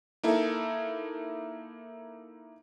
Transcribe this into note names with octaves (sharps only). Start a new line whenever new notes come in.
A#3 D#4 E4 A4